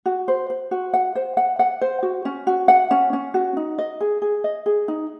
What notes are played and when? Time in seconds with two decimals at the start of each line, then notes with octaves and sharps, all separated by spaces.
0.06 F#4
0.28 C5
0.50 C5
0.71 F#4
0.93 F#5
1.15 C5
1.37 F#5
1.59 F#5
1.81 C5
2.03 F#4
2.25 C#4
2.47 F#4
2.68 F#5
2.91 C#4
3.13 C#4
3.34 F#4
3.57 D#4
3.78 D#5
4.01 G#4
4.22 G#4
4.44 D#5
4.66 G#4
4.88 D#4